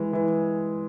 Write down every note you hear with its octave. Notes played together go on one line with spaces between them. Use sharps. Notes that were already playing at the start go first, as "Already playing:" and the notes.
Already playing: E3 G#3
E3